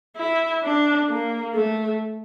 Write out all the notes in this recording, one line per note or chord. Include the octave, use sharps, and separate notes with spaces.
E4
D4
A#3
A3